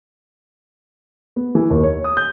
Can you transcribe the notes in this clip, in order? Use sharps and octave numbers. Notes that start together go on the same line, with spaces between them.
B3
E3
D#2
C#5
D#6
G6